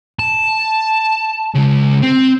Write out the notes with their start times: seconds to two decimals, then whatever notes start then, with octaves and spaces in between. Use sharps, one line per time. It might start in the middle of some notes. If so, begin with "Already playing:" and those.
0.19 A5
1.54 C#3 G#3
2.03 C4